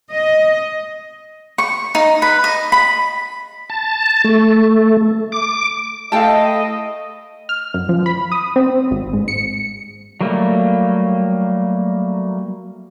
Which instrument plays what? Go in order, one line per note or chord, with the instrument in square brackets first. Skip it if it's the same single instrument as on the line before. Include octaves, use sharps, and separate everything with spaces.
[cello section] D#5
[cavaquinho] C#6
D#4
B4
D#5
B5
[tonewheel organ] A5
A3
D6
[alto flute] A3 [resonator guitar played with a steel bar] E4 F5 [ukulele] A4 G5 A5 [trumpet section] D#5
[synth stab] F6
F#2
F3
B5
D#6
C4
G#1
G#2
C#7
[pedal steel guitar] F#3 G3 A3 A#3